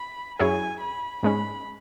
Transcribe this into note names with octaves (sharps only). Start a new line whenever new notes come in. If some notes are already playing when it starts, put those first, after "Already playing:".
Already playing: B5
F#2 F#3 E4 G#4 C#5 G#5
B5
G#2 G#3 C#4 B5